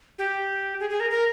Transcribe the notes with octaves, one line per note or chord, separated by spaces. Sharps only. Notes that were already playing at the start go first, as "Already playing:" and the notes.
G4
G#4
G#4
A#4
A#4